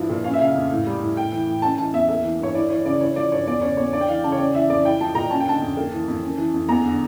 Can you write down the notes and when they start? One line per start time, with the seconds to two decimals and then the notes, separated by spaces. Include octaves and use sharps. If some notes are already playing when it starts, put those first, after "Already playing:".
Already playing: G2 F3 E4
0.09 A#2
0.24 C#4 F5
0.33 E5
0.40 C#3 F5
0.55 F2
0.71 A2
0.87 G3
1.02 A2
1.17 A2 G5
1.32 E3
1.47 A2
1.62 C#4 A5
1.78 E3 A5
1.93 E2 E5
2.08 A#3 E5
2.24 E3
2.39 G2 C#5
2.54 E4 D5
2.70 E3 C#5
2.85 C#3 D5
3.00 E4 C#5
3.16 F3 D5
3.32 G2 C#5
3.47 E2 D5
3.62 C#3 C#5
3.77 E2 C#5
3.93 D4 D5
4.01 G5
4.08 E3 F5
4.24 C#3 A5
4.32 C#5
4.39 C#4 D5
4.54 E3 E5
4.70 F2 D5
4.85 E4 G5
5.00 F3 A5
5.15 A#2 A#5
5.30 C#4 A5
5.40 G5
5.46 D3 A5
5.61 F2
5.77 A#3
5.92 E3
6.08 F2
6.23 C#4
6.38 E3
6.54 F2
6.69 E2 A#5
6.84 D3